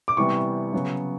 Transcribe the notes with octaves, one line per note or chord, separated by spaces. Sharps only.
D6
C3 E3 G3 B3 C#6
C#3 F#3 B3